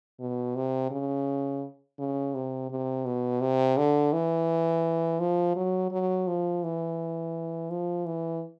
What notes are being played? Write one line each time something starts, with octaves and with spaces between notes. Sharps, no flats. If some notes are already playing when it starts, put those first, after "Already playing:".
B2
C3
C#3
C#3
C3
C3
B2
C3
D3
E3
F3
F#3
F#3
F3
E3
F3
E3